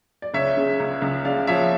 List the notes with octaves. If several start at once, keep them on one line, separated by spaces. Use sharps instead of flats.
D5
C#2 C#5 E5
C#3
C#2
C#2
C#3 D5 F5
F3 C#5 E5